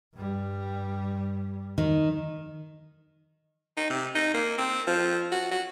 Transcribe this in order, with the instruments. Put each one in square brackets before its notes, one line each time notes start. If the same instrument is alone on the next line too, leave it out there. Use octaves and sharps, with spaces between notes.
[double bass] G2 G3
[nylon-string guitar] D#3
[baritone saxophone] D#4
C3
D#4
A#3
C4
F3
F#4
F#4